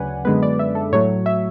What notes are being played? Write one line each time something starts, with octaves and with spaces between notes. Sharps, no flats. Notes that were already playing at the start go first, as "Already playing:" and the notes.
Already playing: D2 C#3 F#3 C#4 B4 D5 F#5 G#5
F#2 D3 G#3 B3 B4
D5
E5
A4
A2 F#3 A3 C#5
E5